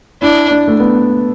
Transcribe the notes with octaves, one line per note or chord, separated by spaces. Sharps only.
D4 E4
D4
A3
B3